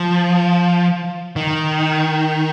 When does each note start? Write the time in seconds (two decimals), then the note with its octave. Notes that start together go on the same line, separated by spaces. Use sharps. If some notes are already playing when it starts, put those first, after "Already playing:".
Already playing: F3
1.36 D#3